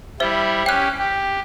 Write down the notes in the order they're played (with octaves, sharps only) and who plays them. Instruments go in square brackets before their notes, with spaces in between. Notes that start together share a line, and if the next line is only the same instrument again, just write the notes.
[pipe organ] G3 E4 [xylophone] C5 E5
[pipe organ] C#4 G4 [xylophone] G5 F#6
[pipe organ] G4